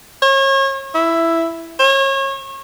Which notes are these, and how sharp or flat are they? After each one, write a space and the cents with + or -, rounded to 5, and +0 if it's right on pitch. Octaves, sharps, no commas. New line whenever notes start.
C#5 -35
E4 +5
C#5 -30